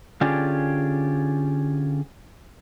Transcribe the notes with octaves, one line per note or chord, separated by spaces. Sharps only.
D3 C#4 F4 G4 G#4 D5